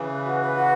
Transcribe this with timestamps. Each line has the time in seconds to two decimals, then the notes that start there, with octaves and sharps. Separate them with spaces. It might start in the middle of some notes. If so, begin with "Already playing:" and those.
Already playing: C#3 E3
0.09 B4
0.23 F#4
0.39 B4
0.53 F#4